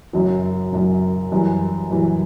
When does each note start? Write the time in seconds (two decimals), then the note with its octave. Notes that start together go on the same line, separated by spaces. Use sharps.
0.13 F#1 F#2 F#3
0.72 F#1 F#2 F#3
1.32 F#2 E3 G3
1.90 F#2 E3 G3